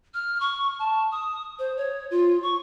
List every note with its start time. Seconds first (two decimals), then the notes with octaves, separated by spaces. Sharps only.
0.14 F6
0.40 C#6
0.79 A5
1.12 D#6
1.59 C5
1.77 C#5
2.11 F4
2.43 C#6